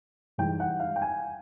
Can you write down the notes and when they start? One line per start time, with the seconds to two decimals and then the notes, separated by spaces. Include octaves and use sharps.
0.38 G#2 E3 G3 G5
0.60 F#5
0.80 F5
0.96 G5
1.02 G#5